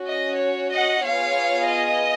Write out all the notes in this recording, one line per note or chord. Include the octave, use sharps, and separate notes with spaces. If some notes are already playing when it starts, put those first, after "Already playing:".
Already playing: C#4 F#4
D#5
C#5
D#5 F#5
B3 F4 G#4 C#5 F5
D#5